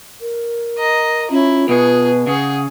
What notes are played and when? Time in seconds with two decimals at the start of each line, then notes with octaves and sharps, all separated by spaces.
0.21 A#4
0.78 D#5 A#5
1.31 C#4 E4 F4
1.69 B2 G#4 B4
2.27 C#3 G#4 F#5